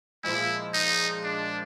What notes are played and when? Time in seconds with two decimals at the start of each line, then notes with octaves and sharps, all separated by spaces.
0.24 A#2 F3 G#3 E4
0.74 D#4
1.24 D4